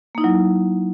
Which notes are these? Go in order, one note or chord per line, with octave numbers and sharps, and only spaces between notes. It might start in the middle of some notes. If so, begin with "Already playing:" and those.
F#3 A#3 D#4 E4